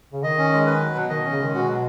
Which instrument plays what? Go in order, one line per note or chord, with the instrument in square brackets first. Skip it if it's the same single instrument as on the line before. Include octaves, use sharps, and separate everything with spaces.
[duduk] C#3
[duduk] D#3 [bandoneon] D#5
[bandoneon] C#4
G#3
B4
F#3
B2
[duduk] D#3 [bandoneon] D#5
[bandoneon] C#4
[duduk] C#3
[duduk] D#3 [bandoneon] G#3
[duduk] B2 [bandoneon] F#4
[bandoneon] F#3